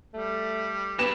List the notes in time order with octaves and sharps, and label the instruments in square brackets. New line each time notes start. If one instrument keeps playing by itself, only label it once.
[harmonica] G3 [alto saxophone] A3
[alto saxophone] B3 [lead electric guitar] G4 B4 [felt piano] E7